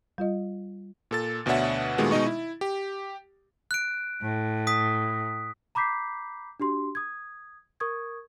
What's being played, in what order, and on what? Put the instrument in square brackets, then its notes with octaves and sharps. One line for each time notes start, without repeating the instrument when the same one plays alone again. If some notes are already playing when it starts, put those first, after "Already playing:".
[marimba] G3 F4 D#5
[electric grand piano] A#2 A4 A6
D2 B2 D4 C#5 E5 F#5
A#2 D#3 G#3 A3 B3 F#4
B2 G#3 D#4 D#5 C#6
E4
G4
[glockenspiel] F#6 D7
[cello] A2
[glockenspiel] D#6 B6
[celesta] A#5 B5 D6 G6 B6 C7
D4 F#4 G4 C6
D#6 G#6
A#4 C#6 D#6 G#6